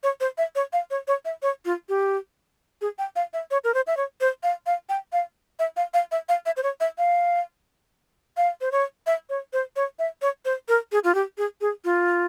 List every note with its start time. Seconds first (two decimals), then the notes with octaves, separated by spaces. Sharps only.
0.03 C#5
0.21 C5
0.38 E5
0.55 C#5
0.73 F5
0.91 C#5
1.08 C#5
1.25 E5
1.42 C#5
1.65 F4
1.89 G4
2.81 G#4
2.99 G5
3.16 F5
3.33 E5
3.51 C#5
3.64 A#4
3.74 C5
3.87 E5
3.97 C#5
4.21 C5
4.43 F5
4.66 F5
4.89 G5
5.13 F5
5.59 E5
5.77 F5
5.94 F5
6.12 E5
6.29 F5
6.46 E5
6.57 C5
6.63 C#5
6.80 E5
6.98 F5
8.37 F5
8.61 C5
8.72 C#5
9.07 E5
9.30 C#5
9.53 C5
9.76 C#5
9.99 E5
10.22 C#5
10.45 C5
10.68 A#4
10.92 G#4
11.04 F4
11.15 G4
11.38 G#4
11.61 G#4
11.85 F4